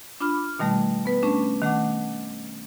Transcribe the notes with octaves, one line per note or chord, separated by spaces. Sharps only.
D4 F4 B5 D6 F6
B2 D#3 G3 A3
B3 B4
A3 C#4 D4
D#3 A3 F#5 D6